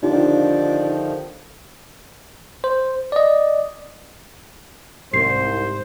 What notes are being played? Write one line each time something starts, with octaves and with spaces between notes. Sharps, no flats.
D3 D#3 F3 D4 D#4 F4 G4
C5
D5 D#5
C2 G#2 C3 D#3 C5 C7